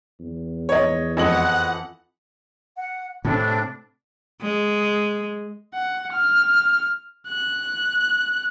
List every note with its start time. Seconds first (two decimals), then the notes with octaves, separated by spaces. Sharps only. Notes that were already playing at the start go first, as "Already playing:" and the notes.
0.20 E2
0.69 C#5 D#5
1.17 F2 E3 D#5 F#5 F#7
2.76 F#5
3.25 A2 C3 D4
4.42 G#3
5.74 F#5
6.12 F6
7.28 F#6